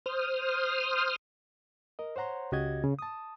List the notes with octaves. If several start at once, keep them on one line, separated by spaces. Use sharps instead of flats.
C5 D#6 F6
A#4 D#5
C5 C#5 F#5 A#5 C6
C#2 C#3 F#4 G4 D#5 G#6
C#3
A5 D#6